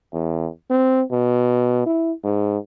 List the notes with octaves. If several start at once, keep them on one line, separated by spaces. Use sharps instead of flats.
E2
C4
B2
E4
G#2